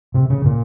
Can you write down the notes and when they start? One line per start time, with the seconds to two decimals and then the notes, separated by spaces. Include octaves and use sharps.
0.14 C3
0.30 C#3
0.45 A#2